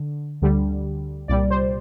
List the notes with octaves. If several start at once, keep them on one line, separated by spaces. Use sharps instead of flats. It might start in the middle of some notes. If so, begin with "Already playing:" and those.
Already playing: D3
D2 D3 G3
C2 A#2 G3 D5
C5